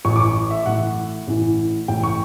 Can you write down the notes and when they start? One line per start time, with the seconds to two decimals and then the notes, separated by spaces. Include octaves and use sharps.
0.05 A1 A2 E3 C#6
0.16 D6
0.20 C#6
0.51 E5
0.66 A1 A2 E3 F#5
1.27 A1 A2 E3
1.88 A1 A2 E3 G5
2.03 C#6